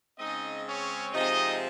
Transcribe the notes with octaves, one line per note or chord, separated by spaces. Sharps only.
C#3 G#3 C4 D#4 D#5
C#4 C#5
C3 F3 G#3 C4 D#4 D#5